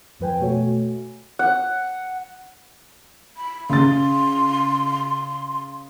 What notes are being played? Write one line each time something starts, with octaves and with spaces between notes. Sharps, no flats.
F2 F3 B4 G5 G#5
B2 A3 F#4 C#5 G#5
F#5
B5
C#3 C6 A6